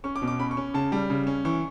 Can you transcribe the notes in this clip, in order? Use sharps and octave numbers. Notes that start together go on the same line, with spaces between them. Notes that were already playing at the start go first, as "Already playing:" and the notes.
C#4 C#6
D6
B2
D6
C#4 B5
C#6
C#4
C#3 A5
G3
C#3
C#4
E3 C#6